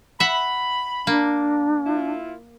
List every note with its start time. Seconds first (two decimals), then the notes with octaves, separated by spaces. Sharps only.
0.20 E5 F#5 B5
1.07 A#3 D4
1.86 E4 F4